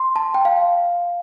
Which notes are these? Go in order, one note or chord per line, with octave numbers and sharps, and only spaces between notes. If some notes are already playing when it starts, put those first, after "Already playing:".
Already playing: C6
A5
G5
F5